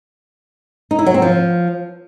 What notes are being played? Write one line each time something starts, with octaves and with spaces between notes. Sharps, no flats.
D#4
E4
F#3
C4
F3